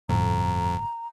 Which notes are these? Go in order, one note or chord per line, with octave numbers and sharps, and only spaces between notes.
G1 F2 A2 A3 A#5